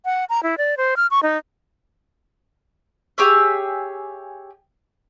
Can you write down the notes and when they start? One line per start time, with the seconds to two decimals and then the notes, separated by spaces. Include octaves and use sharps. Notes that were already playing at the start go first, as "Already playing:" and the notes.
0.05 F#5
0.30 A#5
0.43 E4
0.58 D5
0.77 C5
0.97 F6
1.11 C#6
1.23 D#4
3.18 G4 G#4 C#5 E5